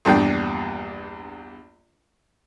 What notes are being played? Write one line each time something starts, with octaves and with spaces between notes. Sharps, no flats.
A#1 E2 G2 D4 G5